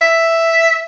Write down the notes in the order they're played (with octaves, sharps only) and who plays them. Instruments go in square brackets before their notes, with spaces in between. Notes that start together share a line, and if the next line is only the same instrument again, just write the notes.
[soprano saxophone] E5